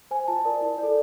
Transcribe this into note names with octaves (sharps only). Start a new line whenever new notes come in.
C5 G#5
F4 A5
A#4 D5
E4
A4 D5